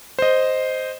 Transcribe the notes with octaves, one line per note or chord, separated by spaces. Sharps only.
C5 D#5